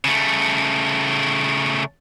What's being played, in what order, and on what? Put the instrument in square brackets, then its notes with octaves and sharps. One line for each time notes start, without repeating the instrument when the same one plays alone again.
[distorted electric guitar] C#3 A3